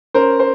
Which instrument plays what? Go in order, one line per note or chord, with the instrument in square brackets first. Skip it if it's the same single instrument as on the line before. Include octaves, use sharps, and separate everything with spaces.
[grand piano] C#4 A#4 C5
C5